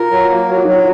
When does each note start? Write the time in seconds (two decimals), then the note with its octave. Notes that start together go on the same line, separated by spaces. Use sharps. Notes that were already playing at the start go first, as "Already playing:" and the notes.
Already playing: F4 A#4
0.11 F#3
0.29 A#3
0.48 F#3 F#4
0.57 F4
0.65 F#3 D#4
0.74 F4